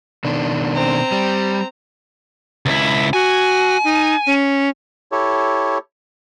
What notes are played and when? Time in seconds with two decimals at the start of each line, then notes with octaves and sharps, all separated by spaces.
0.25 B2 D#3 D4
0.75 C4 A#5
1.12 G3
2.66 C#2 E4
3.13 F#4 G#5
3.84 D#4
4.27 C#4
5.12 E4 G4 A4 C#5